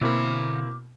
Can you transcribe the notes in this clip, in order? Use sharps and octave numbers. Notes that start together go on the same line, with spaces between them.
B2 D3 A#3 C4 E4 B5 D6